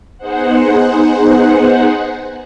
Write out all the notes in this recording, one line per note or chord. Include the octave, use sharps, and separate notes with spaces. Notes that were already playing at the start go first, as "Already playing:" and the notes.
B3 D#4 G#4 C5 F#5